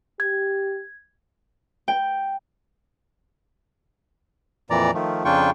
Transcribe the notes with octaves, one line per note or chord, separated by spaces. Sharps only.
G4 G#6
G5
F2 A#2 E3 D5 A#5
D#3 F3 A3
F2 C#3 D4 F4 G5 C#6